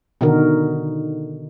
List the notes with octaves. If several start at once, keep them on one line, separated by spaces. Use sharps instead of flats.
B2 D3 D#3 D#4 F#4 A#4